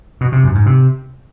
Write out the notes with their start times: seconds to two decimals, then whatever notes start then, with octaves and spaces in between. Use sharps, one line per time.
0.21 B2
0.32 C3
0.44 F#2
0.55 G#2
0.66 C3